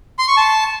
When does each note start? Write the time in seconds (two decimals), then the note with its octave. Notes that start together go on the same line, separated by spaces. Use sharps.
0.19 C6
0.28 C#6
0.37 A5